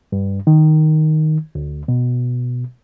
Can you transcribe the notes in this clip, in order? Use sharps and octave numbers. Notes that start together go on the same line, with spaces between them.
G2
D#3
D2
B2